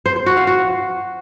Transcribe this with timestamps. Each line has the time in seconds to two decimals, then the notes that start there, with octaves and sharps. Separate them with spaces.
0.06 C5
0.16 C5
0.26 F#4
0.37 F5
0.47 F#4